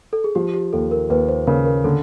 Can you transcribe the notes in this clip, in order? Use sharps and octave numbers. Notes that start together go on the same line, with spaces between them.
A4
G#4
F3 G4
G4
D#2 A4
A#4
D#2 B4
C5
C#3 A#4
A#4
D3 A4